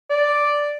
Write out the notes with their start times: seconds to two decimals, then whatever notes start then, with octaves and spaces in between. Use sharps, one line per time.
0.10 D5